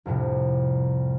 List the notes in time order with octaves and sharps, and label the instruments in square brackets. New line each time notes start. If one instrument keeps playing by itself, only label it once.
[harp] C2 F2 A2 C3